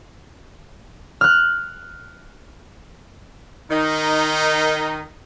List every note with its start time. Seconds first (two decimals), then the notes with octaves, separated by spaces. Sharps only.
1.21 F6 F#6
3.71 D#3 D#4